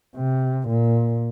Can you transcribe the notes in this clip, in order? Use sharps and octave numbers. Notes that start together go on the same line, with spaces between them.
C3
A#2